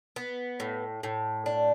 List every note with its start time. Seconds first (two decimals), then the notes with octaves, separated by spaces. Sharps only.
0.16 B3
0.60 A2
1.03 A2
1.46 D4